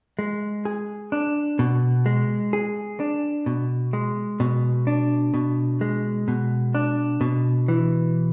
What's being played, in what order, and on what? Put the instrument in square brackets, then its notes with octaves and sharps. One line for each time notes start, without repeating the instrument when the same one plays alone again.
[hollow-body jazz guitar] G#3
G#4
D4
B2
G#3
G#4
D4
B2
G#3
B2
D4
B2
G#3
B2
D4
B2
E3